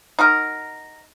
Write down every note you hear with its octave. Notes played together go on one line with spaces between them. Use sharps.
D#4 F#4 A#4